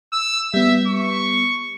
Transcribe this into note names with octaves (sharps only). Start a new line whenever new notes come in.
E6
G3 B3 E5
C#6